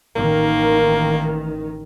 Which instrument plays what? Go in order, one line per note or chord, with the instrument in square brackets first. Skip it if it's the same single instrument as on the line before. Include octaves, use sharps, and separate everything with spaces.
[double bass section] A1 D#3 [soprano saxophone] A#3